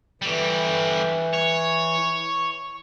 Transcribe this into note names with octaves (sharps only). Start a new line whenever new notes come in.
D3 E3 G3
C#5